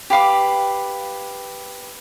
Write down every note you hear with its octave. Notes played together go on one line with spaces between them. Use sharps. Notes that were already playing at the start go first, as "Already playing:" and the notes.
G4 B4 F5 D6